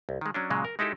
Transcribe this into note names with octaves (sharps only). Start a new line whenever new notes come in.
C2
D#3 G#3
F#3 C#4 D4
A#2 C#3 F#3 G#3
A#4
G#3 D#4 E4 G4 A4